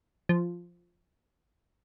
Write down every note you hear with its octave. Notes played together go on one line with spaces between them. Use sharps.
F3